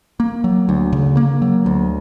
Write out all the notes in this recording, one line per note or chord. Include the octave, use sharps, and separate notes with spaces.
A#3
F#3
D2
C#3
A#3
F#3
D2